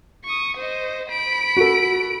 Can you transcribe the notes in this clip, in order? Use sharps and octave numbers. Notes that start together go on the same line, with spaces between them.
C#6 D#6
C5 D#5
B5 D7
F#4 A4